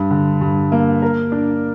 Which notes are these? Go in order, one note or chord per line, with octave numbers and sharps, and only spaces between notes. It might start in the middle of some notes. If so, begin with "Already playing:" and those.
Already playing: G2
D3
G2
A#3
A#4
D4